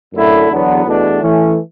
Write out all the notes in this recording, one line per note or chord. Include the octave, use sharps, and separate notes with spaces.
F#2 D3 A3 E4
E2 D3 F#3 B3
E2 B2 A3 D4
E3 A3 C#4